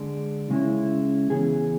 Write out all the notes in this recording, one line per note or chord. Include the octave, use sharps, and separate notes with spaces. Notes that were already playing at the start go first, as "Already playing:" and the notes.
Already playing: D3 G#3 D4 G#4
C#3 G#3 C#4 E4
C#3 E3 B3 G#4